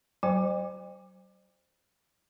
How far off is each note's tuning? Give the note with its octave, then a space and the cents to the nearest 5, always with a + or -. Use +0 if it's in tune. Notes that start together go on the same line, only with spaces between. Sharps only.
F#3 +35 C5 +0 G5 +45